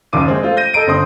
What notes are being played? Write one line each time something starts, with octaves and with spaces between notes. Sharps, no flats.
F#1 D#2 F3 D6 D#7
G#3 C4 C#4
A3 F4 C5
G6 A#6 D#7
A4 D#5 A#5 D7 D#7
G1 D3 C4 C6 D#6